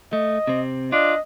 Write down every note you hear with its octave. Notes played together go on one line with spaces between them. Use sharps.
A3 D#5
C3 C4
D4 F4 D#5